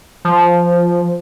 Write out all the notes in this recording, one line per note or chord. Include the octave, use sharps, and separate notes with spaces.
F3